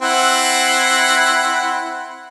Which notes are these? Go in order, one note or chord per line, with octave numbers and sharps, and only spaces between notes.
C4 E4 F#5